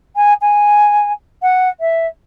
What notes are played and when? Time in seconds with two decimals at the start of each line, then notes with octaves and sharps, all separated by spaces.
0.16 G#5
0.41 G#5
1.42 F#5
1.80 E5